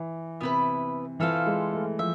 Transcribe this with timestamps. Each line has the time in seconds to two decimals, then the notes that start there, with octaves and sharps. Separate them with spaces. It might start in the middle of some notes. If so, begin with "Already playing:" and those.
Already playing: E3
0.41 C3 B3 E4 B4
1.20 E3 F4 A4 C5 F5
1.46 G#3
1.73 A3
1.99 F3 E5